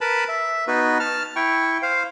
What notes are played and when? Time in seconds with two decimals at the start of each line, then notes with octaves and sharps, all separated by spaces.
0.01 A#4 B4 A5 B5
0.29 E5
0.68 B3 D#4 F#4 B4
1.00 A5 F6
1.36 E4 G5 C#6
1.83 C5 F5